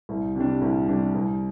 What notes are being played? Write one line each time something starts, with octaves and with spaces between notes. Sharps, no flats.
C2
C3 G3 D4
C2
C3 G3 D4
C2